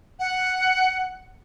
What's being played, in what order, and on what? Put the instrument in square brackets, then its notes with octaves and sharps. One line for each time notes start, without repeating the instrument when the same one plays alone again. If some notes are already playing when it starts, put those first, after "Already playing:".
[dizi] F#5